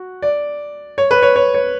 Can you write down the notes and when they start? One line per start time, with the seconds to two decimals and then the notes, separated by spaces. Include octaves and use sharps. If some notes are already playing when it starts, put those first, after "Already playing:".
Already playing: F#4
0.22 D5
0.98 C#5
1.11 B4
1.22 C#5
1.36 C#5
1.54 C#5